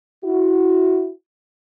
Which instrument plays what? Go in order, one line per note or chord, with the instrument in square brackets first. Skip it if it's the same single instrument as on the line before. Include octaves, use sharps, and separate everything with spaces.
[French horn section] E4 F#4